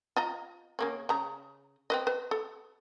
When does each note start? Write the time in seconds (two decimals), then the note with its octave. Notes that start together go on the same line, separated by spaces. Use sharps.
0.16 F4 D#5 A#5
0.79 C#3 A#3 C#4
1.09 C#3 A#5
1.90 C4 B4 D#5
2.07 B4
2.31 A4